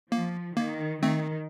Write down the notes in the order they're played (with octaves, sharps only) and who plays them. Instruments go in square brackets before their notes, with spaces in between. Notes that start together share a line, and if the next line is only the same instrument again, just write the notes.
[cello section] F3 [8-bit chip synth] A#3
[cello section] D#3 [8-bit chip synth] A#3
[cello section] D#3 [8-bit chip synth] A3 C4